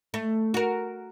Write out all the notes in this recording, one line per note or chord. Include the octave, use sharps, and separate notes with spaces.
A3
F#4 A#4